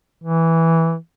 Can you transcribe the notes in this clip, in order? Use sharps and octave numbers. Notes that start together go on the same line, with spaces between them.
E3